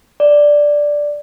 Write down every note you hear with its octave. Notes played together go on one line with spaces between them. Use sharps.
D5